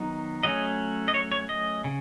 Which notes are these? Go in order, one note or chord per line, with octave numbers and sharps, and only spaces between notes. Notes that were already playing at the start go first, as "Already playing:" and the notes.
Already playing: D#3 F#3 B3 D#4
F#3 A3 C#4 D#5
D#5
C#5
C#5
D#5
C#3